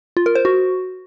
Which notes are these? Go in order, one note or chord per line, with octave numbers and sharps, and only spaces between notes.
F4
A#4
C5
F#4